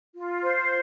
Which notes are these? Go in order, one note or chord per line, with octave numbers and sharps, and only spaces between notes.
F4
C5